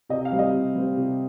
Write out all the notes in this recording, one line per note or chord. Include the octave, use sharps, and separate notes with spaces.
C3 D#5
F5
G3 C4
D#5
C3
G3 C4
C3